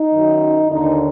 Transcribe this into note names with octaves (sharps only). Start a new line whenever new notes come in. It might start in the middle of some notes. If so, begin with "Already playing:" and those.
Already playing: D#4
F#2 D#3
D#2 D3 D#4